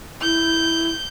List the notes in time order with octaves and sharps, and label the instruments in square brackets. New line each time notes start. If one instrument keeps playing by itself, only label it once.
[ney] E4 [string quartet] G6